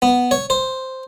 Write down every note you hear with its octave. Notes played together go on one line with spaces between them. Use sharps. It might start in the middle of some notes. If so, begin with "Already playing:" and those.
B3
C#5
C5